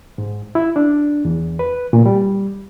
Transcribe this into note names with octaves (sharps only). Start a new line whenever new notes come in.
G#2
E4
D4
E2
B4
A#2
G3